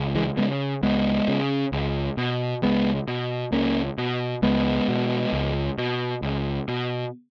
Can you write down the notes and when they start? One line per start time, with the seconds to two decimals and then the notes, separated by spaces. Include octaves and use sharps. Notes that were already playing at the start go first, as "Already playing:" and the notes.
Already playing: C#2
0.15 E3 G#3
0.37 C#3 G#3 B3
0.83 C#2 G#3 B3
1.28 C#3
1.72 C#2
2.17 B2
2.62 C#2 G#3 B3
3.08 B2
3.52 C#2 A#3 C#4
3.98 B2
4.42 C#2 G#3 B3
4.88 B2
5.33 C#2
5.78 B2
6.22 C#2
6.68 B2